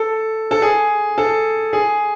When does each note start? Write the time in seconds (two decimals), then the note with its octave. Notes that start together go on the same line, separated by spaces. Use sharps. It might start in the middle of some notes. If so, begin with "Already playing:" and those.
Already playing: A4
0.51 A4
0.62 G#4
1.18 A4
1.73 G#4